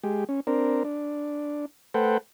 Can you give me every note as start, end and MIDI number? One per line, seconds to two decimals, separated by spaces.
0.04 0.24 56
0.04 0.24 67
0.29 0.40 61
0.47 0.83 60
0.47 0.83 62
0.47 0.83 70
0.85 1.66 62
1.94 2.18 57
1.94 2.18 69
1.94 2.18 71
1.94 2.18 72
1.94 2.18 78
1.94 2.18 79